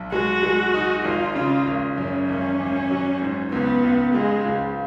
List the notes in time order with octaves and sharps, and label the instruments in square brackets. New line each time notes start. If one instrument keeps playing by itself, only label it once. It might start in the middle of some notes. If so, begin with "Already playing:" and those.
Already playing: [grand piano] B1
[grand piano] G#3 [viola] F#4
[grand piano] G#3
D#4
[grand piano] G#1 [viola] F4
[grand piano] C#3 [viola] F4
[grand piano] G#1
[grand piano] F#2 [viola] C#4
[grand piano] G#1 [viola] C#4
[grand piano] G#1
F#3
G#2
[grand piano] C#2 [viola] B3
[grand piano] C#2
[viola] G#3 [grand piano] F4
[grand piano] C#2